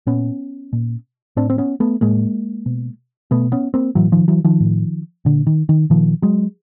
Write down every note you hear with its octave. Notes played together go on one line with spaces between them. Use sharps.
A#2 B3 C#4
A#2
A2 C4 D4
C4
B3 C#4
A3 B3
A2 G#3 A#3
B2
B2 A3 B3
B3 C#4
A#3 C4
A2 E3 F#3
D#3 F3
E3 F#3
D#3 F3
A2
A#2 D3
D#3
D#3
A#2 D#3 F3
F#3 G#3